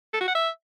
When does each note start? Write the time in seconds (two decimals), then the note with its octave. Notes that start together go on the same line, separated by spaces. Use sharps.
0.13 A4
0.21 F#4
0.28 F#5
0.35 E5